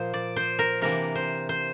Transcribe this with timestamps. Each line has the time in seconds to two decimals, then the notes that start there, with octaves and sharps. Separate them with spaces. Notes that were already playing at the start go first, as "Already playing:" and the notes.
Already playing: A#2 F3 A#3 C5
0.14 D5
0.36 C5
0.59 A#4
0.81 C3 E3 A#3 D4 A#4
1.16 C5
1.49 C5